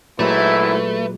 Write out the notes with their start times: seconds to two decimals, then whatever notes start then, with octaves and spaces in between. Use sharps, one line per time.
0.19 G#1 A#2 F#3 G#3 A3 E4 B4